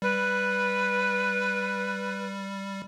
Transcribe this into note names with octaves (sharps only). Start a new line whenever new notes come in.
G3 B4